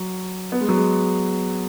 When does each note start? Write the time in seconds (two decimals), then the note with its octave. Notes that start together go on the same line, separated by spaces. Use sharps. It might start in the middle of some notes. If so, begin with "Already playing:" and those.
Already playing: F#3
0.52 B3
0.61 G#3
0.69 F#3
0.77 G#3